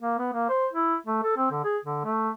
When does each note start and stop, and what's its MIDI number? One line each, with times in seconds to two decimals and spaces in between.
0.01 0.18 58
0.18 0.29 59
0.33 0.48 58
0.49 0.67 72
0.73 0.96 64
1.07 1.19 57
1.23 1.34 69
1.37 1.47 60
1.51 1.61 50
1.64 1.78 68
1.85 2.00 50
2.05 2.30 57